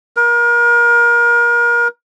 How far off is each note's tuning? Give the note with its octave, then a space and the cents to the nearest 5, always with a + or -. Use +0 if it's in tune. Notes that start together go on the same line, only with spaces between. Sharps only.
A#4 +30